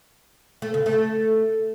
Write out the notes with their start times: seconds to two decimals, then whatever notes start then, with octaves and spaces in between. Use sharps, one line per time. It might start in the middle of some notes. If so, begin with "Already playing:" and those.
0.62 A3
0.74 C#3
0.86 A3